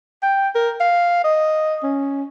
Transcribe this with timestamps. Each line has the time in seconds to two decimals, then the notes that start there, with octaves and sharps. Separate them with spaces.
0.23 G5
0.55 A#4
0.80 F5
1.24 D#5
1.83 C#4